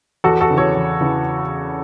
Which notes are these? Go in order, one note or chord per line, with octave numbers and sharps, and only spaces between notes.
E2 F#4 A4
F#4 A4
C#3 E3
A4 C#5
E2
C#3 E3